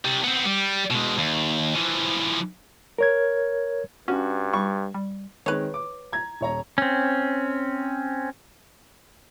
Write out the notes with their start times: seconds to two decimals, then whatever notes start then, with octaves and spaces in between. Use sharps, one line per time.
0.05 C3 G3
0.24 B3 C4
0.45 G3
0.91 B2 G#3
1.18 D#2
1.75 E3 F3
2.99 A#4 C#5 G#6
4.08 G2 C#4 F#4
4.53 G3 C#6
4.94 G3
5.46 D#3 G#3 C4 B4 C#5
5.74 D6
6.12 A#5 G#6
6.41 D#1 C#5 A#5
6.78 C4 C#4